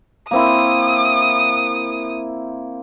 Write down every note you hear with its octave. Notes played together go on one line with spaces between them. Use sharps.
A#3 C4 E4 D#6